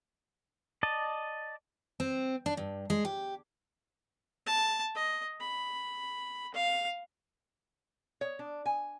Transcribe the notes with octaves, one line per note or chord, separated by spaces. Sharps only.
D5 D#5 A5
C4
D4
G2
G#3
G4
A5
D#5
B5
F5
C#5
D4
G#5